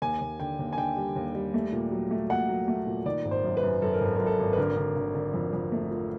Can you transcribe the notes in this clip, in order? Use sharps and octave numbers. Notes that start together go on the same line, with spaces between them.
D#2 G#5
D#2
D3 G5
D#2
G#5
D3 G5
G3
D#2
G3
A3
A#2
F#3
A3
A#2 F#5
F#3
A3
A#2
D#3 D5
G#1
C5
F#2
B4
F#2
F#2 A4
A#4
G#1 A4
F#2 A#4
A4
G#1
B4
D3 A#4
D3
D3
D3
F2
F2
A3
F3